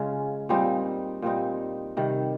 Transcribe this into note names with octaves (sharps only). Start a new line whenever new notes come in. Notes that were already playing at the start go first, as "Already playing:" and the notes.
Already playing: C#3 G#3 C#4 F4
A#2 G3 C4 D#4
A#2 G3 C4 D#4
C3 D#3 G3